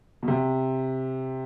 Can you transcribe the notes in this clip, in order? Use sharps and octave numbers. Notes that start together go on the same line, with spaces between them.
B2
C3